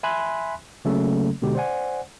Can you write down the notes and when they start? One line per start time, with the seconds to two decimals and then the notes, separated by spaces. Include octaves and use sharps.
0.03 E5 G#5 B5 C6 F#6
0.85 C#3 F#3 A3 A#3 C#4 A4
1.42 B2 D3 G#3 G4
1.55 C5 D5 F#5 G#5